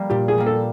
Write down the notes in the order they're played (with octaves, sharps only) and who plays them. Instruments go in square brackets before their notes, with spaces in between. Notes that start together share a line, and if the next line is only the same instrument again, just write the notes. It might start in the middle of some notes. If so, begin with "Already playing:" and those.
Already playing: [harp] G3 A#3
[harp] A#2 [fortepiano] G4
[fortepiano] G#4
[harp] G3 A#3
[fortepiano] A4